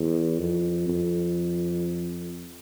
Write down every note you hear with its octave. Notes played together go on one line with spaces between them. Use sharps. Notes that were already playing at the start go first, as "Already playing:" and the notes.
Already playing: E2
F2
F2